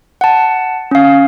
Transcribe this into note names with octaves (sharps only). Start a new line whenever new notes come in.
F#5 A5
C#4 F5